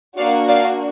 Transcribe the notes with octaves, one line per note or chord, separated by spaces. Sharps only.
A#3 D4 F#4 D5 F5
D5 F5